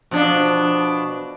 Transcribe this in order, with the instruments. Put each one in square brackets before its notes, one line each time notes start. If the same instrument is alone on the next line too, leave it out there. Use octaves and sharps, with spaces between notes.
[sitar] B2 F3 D4